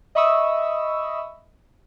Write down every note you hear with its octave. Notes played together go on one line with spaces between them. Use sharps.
D#5 E5 B5 C#6 D#6 E6